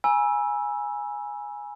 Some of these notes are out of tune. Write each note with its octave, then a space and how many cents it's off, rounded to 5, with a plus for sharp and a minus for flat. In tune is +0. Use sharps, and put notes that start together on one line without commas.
G#5 +0 B5 -45 E6 +0